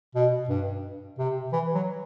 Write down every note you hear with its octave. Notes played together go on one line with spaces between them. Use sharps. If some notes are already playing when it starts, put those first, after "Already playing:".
B2
G2
C3
E3
F#3